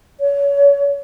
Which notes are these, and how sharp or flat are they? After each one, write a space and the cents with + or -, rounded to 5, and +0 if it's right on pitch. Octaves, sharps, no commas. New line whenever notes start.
C#5 +30